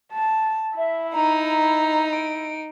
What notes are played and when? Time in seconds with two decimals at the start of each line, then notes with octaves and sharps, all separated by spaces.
0.13 A5
0.77 E4 E5
1.14 D#4 A#5
2.13 D7